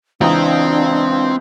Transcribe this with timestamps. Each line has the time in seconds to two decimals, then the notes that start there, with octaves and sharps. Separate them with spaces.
0.21 C#2 E3 C4 D4 A#5 D#6